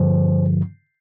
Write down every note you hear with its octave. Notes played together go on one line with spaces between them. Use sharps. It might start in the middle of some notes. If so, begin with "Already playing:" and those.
Already playing: G2 D3 F3 C5